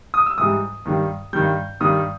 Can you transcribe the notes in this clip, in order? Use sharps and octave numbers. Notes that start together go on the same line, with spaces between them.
D#6
E6
G#2 E3 G3 D#6
G2 D#3 G3
G2 D#3 G3 G6
G2 D#3 G3 D#6